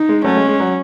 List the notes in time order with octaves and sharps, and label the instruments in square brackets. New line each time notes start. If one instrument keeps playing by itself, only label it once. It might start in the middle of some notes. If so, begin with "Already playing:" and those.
Already playing: [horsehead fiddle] D#4
[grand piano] G#3
[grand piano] F#3 A3 [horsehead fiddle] C#4
[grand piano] G#3
G#3
F#3